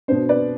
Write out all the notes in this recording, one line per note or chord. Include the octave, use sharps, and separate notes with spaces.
B2 B3 D4 C5
B4 D5